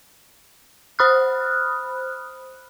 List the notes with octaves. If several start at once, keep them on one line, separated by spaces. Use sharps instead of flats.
C5 B5 D#6 F6 F#6